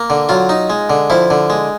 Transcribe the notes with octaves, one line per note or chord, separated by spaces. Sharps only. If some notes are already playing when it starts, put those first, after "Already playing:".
Already playing: A#3
D3
F#3 F4
D#4
G#3
D3
F3 E4
D3
G#3